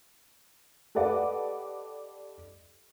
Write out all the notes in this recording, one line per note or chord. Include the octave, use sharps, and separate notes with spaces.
G4 A4 B4 D5 D#5 F#5